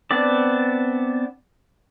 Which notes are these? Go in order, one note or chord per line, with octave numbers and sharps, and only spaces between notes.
B3 C4 D4 D5